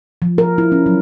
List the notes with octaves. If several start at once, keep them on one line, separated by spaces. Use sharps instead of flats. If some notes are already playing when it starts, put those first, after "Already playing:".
F3
A#4
E4
C#4
F#3